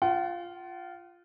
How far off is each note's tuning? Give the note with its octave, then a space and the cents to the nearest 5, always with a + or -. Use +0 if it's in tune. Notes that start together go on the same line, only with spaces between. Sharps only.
F4 +0 F#5 +40